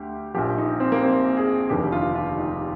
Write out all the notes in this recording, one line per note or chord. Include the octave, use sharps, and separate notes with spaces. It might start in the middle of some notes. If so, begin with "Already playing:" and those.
Already playing: D2 G4
A#1 A#2 F3 G4
D#4
C4
A#3
C4
G#4
F1 D#2 D3 G4
F4
F4
D#4